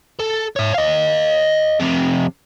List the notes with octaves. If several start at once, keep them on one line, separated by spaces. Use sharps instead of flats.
A4
C#5 E5
D#5 F5
F2 C3